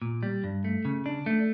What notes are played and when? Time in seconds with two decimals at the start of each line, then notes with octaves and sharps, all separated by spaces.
0.02 A#2
0.23 G3
0.44 G2
0.64 A3
0.85 C#3
1.06 D4
1.26 A3